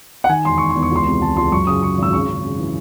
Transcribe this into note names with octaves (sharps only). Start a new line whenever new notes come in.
F#5
D#3 G#5
E1 C6
E1 C#6
C6
E2
C#6
C#2 C6
C3
C#2 A5
C#2 C6
F#2 C#6
C#3 D#6
C#3 C#6
G#1 E6
C#3 C#6
C#3
C#3
E3